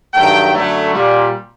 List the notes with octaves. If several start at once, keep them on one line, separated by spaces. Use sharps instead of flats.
G2 D#3 F#3 A3 G5
F#2 D3 F#3 A3
A#2 G3